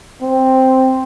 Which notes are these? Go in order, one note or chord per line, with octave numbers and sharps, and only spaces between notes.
C4